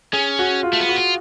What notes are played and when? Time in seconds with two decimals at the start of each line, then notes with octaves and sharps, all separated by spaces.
0.13 C#4 G#4
0.39 F#4
0.63 F4
0.73 A3
0.80 B3
0.89 F#4
0.96 F4